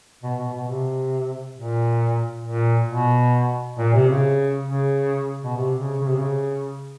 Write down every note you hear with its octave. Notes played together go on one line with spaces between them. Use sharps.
B2
B2
B2
C3
A#2
A#2
B2
A#2
C3
C#3
C#3
B2
C3
C#3
C#3
C3
C#3